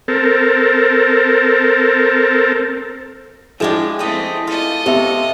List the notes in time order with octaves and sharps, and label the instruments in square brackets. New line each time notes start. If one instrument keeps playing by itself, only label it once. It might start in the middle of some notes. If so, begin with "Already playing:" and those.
[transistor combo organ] C4 A4 A#4
[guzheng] F3 G#3 G4 [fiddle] D4 [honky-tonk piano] E4 G#4 E7
[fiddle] A3 C4 [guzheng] G4 D#5
[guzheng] F4 [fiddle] A4 D#5
[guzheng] C3 [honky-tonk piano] B3 C4 [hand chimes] G4 E5